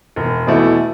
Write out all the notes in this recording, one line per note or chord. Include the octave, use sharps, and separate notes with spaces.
E1
E2 B2 A3 E4